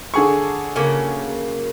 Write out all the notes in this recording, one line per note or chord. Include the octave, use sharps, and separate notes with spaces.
D3 G#4 C#6
C#3 F#3 A#3